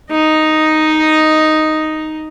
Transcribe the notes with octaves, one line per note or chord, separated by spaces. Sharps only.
D#4 D#5